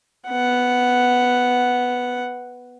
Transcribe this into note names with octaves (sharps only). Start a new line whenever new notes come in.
B3 F#5